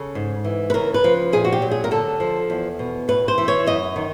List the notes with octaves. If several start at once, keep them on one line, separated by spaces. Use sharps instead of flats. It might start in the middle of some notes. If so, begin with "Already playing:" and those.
Already playing: C#3 A4
G#2
E3
B4
C#3 A#4
B4
F3
A#2 G#4
F#4
G4
F#3
G#4
A#4
D3 A4
F3
E2
B2
A2 B4
C5
E3
C#5
F#2 D#5
D#3